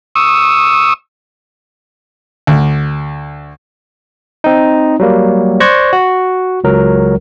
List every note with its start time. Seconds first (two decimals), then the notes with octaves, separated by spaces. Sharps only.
0.15 C#6 D#6 E6
2.47 D2
4.44 C4 D#4
4.99 F#3 G3 A#3
5.60 C5 D5 C#6 F#6 G#6 A#6
5.93 F#4
6.64 C#2 F#3 A#4